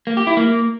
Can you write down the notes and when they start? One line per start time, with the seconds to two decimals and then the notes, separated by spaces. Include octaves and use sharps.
0.07 A#3
0.17 G4
0.27 E4
0.37 A#3